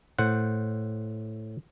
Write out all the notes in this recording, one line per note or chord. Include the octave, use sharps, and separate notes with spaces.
A2 C5 F#5